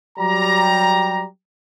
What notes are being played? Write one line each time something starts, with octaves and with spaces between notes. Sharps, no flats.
F#3 G3 G4 A#5